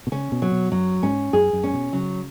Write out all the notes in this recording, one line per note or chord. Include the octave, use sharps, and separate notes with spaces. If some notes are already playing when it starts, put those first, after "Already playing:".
B2
C#3 C#4
B2
F#3
B2
F#2 F#3
G#2 C#4
F#2 G#4
F#2
C#4
B2
C#3 F#3